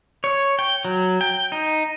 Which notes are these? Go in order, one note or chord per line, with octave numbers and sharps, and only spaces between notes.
C#5
G5
F#3
G5
D#4